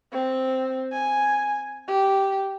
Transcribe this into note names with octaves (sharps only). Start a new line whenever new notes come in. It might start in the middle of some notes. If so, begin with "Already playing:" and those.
C4
G#5
G4